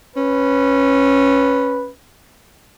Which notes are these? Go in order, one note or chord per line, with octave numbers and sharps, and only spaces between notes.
C#4 B4